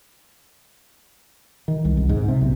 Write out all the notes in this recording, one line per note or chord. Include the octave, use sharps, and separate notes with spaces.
D#3
C2
C2
G#2
C3
B1